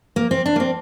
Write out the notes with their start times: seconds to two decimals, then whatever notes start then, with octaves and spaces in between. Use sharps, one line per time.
0.16 A#3
0.31 C4
0.46 D4
0.56 A#3
0.60 C4